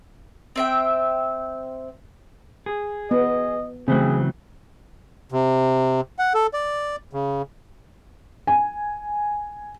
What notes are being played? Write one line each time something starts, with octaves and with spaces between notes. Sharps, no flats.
C4 E5 G5
G#4
B3 D#5
C#3 E3 F#3 A3 C4 G#4
C3
F#5
A4
D5
C#3
G#5